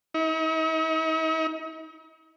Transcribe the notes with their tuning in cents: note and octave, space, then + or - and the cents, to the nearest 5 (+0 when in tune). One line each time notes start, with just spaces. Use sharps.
D#4 +45